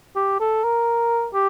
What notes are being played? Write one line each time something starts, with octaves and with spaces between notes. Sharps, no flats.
G4
A4
A#4
G4